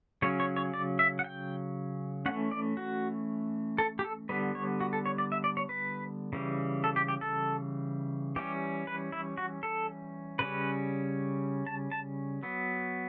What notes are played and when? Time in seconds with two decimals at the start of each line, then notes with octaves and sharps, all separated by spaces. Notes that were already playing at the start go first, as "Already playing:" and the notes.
0.22 C#3 F#3 C#4 C#5
0.40 C#5
0.56 C#5
0.74 D5
0.99 E5
1.19 F#5
1.24 G5
2.26 E3 A3 C#4 F#5
2.51 D5
2.77 F#4
3.78 A4
3.99 G4
4.04 A4
4.29 D3 G3 B3 B4
4.55 C#5
4.81 F#4
4.93 A4
5.06 C#5
5.18 D5
5.32 E5
5.44 D5
5.57 C#5
5.69 B4
6.33 C#3 E3 G3
6.84 A4
6.96 G4
7.08 G4
7.21 A4
8.36 E3 G3 C#4 G4
8.87 B4
9.12 E4
9.37 F#4
9.63 A4
10.39 C#3 G3 C#4 B4
11.67 A5
11.92 A5
12.43 F#3 B3